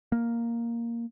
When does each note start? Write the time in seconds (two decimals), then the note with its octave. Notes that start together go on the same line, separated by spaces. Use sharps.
0.12 A#3